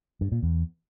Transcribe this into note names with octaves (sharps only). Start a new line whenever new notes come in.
G2
A#2
E2